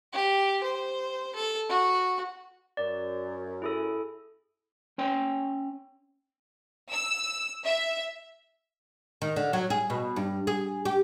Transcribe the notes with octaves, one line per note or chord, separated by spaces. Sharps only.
G4
C5
A4
F#4
F#2 D5
E4 G#4 A4
C#4 C#5 G5 G#5 C6
E6
E5
D#3
D3
F#3
G#4
B2
G2
G#4
G4